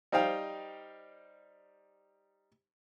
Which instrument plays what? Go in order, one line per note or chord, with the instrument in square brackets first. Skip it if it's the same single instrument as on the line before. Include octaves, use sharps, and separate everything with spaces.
[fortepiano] G3 D#4 C5 F5 G5